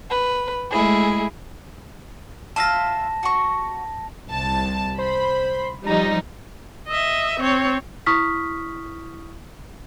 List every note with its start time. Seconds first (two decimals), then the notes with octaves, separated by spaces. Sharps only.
0.10 B4
0.71 G#3 A3 E4 G#4
2.56 F4 E5 F5 A5 A#6
3.23 F#4 C#6
4.28 C2 A5
4.98 C5 B5
5.86 F3 G3 D#4 A#5
6.88 D#5 E5
7.40 C4 C#5
8.06 E4 C#6 D#6 F6 B6